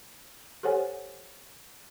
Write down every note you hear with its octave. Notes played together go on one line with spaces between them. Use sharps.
G4 A4 C5 C#5 F#5 G#5